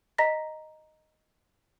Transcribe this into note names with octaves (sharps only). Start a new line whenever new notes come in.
D#5 A#5 A#6 B6